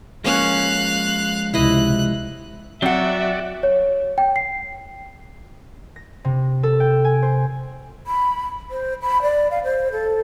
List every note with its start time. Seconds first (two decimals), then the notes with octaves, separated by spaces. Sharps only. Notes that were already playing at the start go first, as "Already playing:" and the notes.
0.24 F3 G#3 A#3 C#4 C#5 F5 F#6
1.54 C#2 C3 E4 D#5 F#6
2.82 F#3 C4 F#4 D5 E5 F#5
3.63 C#5
4.18 G5
4.36 C7
5.96 A#6
6.25 C3
6.63 A4
6.80 G5
7.04 G#5
7.22 C5
8.07 B5
8.71 C5
9.02 B5
9.22 D5
9.51 F5
9.64 C5
9.92 A4